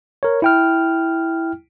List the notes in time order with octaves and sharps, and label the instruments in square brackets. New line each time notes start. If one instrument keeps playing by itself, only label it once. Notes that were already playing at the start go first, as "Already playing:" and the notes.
[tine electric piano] A#4 C#5
E4 G5 F6